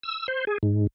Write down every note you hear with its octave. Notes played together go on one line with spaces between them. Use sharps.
E6
C5
G#4
G#2